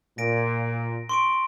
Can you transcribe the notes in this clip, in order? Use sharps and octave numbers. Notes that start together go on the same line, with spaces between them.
A#2 A#6 D7
C6 C#6 D7